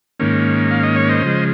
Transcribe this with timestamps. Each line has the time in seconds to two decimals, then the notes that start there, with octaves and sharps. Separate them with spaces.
0.20 G#2 D#3 A#3 C#4
0.71 F5
0.83 D#5
0.96 C#5
1.09 C5 D#5
1.22 C#3 F3 G#3